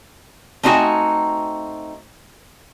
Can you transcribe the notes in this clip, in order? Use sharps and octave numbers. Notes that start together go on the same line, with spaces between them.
A3 C4 D#4 F#4 G#5